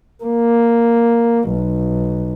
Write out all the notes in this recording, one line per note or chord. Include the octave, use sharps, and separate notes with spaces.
A#3
B1